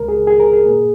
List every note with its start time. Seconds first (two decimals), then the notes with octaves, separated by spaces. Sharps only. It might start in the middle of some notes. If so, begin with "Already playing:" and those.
Already playing: C#2 C#3 G#3 A#4
0.09 G#4
0.27 G#4
0.40 A#4
0.53 G#4
0.65 A#2 A#3